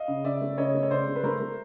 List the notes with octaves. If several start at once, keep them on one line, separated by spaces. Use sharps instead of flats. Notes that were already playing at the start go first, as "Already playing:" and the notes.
Already playing: D#5 F5
C#3
C#3 D5 E5
A3
C#3 C#5 D#5
A3
C#5
C#3 C5 D5
A3
B4
A3 A#4 C5
A3